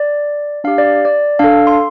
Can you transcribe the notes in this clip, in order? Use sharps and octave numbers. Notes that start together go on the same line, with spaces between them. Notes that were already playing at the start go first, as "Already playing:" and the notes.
Already playing: D5
D4 G4 F5
D5
D5
D4 A4 F5
C6